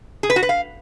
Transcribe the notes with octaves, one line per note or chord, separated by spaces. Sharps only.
G#4
B4
F#4
B4
F5